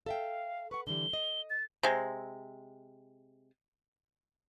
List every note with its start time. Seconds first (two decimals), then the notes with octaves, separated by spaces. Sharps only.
0.06 A4 E5 F5 G5
0.71 B4 F#5 C#6
0.87 D3 E3 G3 G7
1.13 D#5
1.50 A6
1.83 C3 G#3